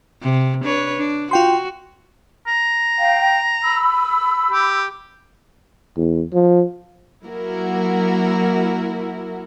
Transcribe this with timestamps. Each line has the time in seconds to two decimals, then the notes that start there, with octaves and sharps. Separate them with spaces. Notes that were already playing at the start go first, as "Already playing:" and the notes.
0.22 C3
0.64 D4 B4 C#5
0.97 D4
1.31 F4 F#4 G5 C6
2.47 A#5
2.98 F5 G5
3.63 B5 E6
4.51 G4
5.97 E2
6.33 F3
7.24 F#3 A#3 E4 F#4 A#4